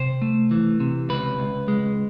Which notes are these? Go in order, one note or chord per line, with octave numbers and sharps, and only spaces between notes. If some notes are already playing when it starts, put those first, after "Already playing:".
Already playing: C3 C5
A3
E3
C3
C#2 B4
C#2
G#3